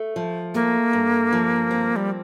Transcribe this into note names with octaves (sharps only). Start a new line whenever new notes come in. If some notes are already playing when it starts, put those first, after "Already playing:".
Already playing: A3
F3
A3 A#3
G2
F3
C4
G3